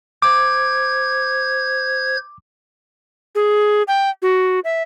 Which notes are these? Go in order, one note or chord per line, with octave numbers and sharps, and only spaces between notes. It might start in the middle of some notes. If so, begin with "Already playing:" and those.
C5 D6 G#6
G#4
G5
F#4
E5